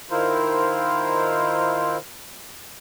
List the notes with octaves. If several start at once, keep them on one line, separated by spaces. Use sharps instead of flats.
D#3 E4 F4 A#4 C5